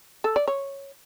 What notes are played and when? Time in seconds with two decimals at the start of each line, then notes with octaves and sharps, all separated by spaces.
0.24 A4
0.36 D5
0.48 C#5